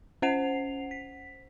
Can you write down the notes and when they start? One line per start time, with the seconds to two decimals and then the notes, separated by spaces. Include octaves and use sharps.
0.22 C#4 C5 F#5 C7 F7
0.91 B6